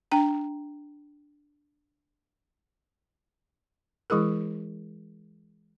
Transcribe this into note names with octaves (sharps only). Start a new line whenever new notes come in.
D4 G5 A#5
E3 G#3 E4 G#4 A#4